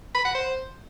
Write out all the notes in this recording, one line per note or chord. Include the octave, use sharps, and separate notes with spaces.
B5
F#5
C5